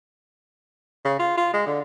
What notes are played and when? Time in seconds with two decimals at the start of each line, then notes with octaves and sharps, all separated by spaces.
1.05 C#3
1.19 F4
1.37 F4
1.53 G#3
1.66 D3